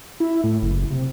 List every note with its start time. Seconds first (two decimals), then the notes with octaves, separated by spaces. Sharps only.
0.20 E4
0.44 A2
0.62 F#1
0.90 C3